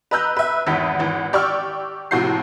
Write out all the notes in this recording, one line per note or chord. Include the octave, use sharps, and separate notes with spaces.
B4 D#5 A#5 E6 F#6 G6
B4 E5
G#1 E2 B6
G#1 E3
G4 D5 C#6 E6 F6
A2 C3 F3 F#4 G6 C7